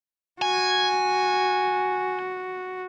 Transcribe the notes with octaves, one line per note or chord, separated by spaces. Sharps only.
F#4 G#5